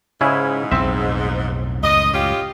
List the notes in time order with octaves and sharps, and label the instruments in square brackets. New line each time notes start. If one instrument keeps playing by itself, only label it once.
[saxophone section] G#2 [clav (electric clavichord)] C#3 E4 G#4
[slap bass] B1 F2 A2 [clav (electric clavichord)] C4 E5
[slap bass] C#2 F#2 A2 [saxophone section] D#5
[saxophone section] C#4 F4 G4